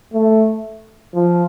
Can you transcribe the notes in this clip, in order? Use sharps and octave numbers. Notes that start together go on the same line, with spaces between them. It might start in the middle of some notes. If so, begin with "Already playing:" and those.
A3
F3